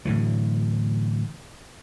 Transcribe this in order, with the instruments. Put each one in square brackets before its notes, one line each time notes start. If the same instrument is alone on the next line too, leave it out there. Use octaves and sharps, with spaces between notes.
[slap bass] A2 D3 E3 F#3